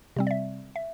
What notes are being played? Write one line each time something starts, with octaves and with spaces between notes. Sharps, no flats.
C3 G3 C4
D5
E5
E5